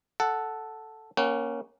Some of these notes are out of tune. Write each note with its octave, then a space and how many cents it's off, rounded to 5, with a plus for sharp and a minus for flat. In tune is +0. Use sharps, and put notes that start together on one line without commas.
A4 +0 F#5 +0
A#3 +15 C#4 +0 F#5 +45